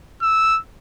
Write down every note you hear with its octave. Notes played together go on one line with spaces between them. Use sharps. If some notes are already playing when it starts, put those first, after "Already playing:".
E6